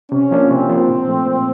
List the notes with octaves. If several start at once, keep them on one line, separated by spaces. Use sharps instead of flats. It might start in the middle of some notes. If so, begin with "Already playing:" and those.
C3 C#4
F3 A#3 D4 F4
C3 C4
F3 A#3 D4 F4
A#2
F3 A3
A#2